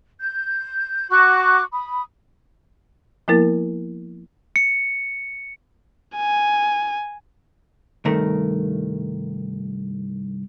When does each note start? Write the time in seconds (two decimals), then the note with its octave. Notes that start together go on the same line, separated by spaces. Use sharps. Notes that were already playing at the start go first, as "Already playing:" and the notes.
0.20 G6
1.10 F#4 C#6 D6 F#6
1.72 B5 D#6
3.28 F3 A#3 B3 E4 A#4 A6
4.56 C#7
6.17 G#5
8.05 C2 G2 D#3 A3 A#4